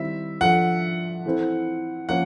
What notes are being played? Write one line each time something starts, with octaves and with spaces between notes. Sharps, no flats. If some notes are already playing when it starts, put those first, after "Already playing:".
Already playing: D#3 G3 C4 E4 E5
F3 A3 D4 F#5
E3 A3 C4 E4
F3 A#3 C#4 F#5